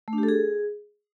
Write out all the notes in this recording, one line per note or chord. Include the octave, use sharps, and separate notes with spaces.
A3
D4
G4
A4
G#4